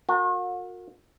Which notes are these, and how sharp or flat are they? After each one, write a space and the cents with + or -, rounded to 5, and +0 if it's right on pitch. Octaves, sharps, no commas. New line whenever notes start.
F#4 -40 A#4 -30